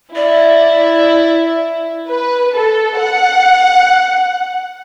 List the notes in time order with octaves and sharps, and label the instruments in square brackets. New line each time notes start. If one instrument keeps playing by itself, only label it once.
[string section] E4 [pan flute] D5
[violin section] B4
A4
F#5